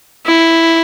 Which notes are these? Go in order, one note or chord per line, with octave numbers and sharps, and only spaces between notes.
E4